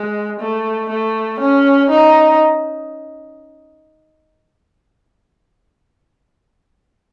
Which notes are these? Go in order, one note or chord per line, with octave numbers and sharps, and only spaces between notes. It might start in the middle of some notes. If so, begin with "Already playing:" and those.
Already playing: G#3
A3
A3
C#4
D#4